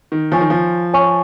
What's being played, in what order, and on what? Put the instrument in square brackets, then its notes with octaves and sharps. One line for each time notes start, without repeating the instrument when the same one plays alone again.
[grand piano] D#3
[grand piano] F3 [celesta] C#5 G#5 C#6
[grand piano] D#3
F3
[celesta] C#5 G#5 C#6